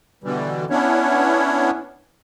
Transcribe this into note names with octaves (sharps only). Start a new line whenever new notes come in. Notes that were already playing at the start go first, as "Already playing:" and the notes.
B2 D3 E3 G3
B3 C#4 D4 E4 C#5